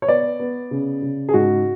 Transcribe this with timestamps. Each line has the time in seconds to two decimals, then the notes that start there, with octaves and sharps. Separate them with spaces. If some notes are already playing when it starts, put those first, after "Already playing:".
0.02 C#5
0.08 B3 D5
0.39 B3
0.71 C#3
1.02 C#3
1.29 G#4
1.34 G#2 F#4